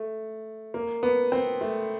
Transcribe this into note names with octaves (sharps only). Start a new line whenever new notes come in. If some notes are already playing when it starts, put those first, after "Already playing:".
Already playing: A3
A#3
B3
C4
A3